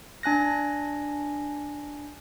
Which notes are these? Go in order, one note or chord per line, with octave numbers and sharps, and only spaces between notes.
D4 G#5 F#6 A#6